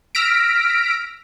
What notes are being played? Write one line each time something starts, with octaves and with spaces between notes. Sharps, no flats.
E6 F6 A#6 B6 D7